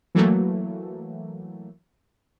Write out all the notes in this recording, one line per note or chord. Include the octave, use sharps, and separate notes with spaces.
E3 F#3 A3 A#3